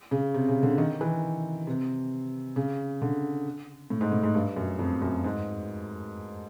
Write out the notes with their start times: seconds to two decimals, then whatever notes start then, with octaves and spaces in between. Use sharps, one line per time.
0.11 C#3
0.34 C3
0.49 C#3
0.63 D3
0.78 D#3
1.01 E3
1.67 C3
2.56 C#3
3.02 D3
3.90 A2
4.01 G#2
4.12 A2
4.23 G#2
4.34 G2
4.56 F#2
4.79 F2
5.02 F#2
5.24 G#2